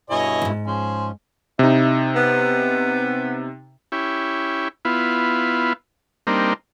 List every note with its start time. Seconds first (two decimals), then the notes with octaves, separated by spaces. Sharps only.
0.10 G2 B2 E4 G#4 C#5 D#5
0.42 E2 G#2
0.66 F3 C#4 G#4 C5
1.59 C3 D#4 E4
2.16 B3
3.92 C#4 E4 G4
4.85 B3 E4 F4
6.27 G3 A#3 C4 D4 D#4